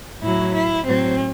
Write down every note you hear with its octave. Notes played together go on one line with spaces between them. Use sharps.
A2 F#3 E4
E4
A2 F#3 C4